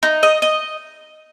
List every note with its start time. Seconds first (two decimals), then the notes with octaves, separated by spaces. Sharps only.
0.03 D#4
0.23 D#5
0.42 D#5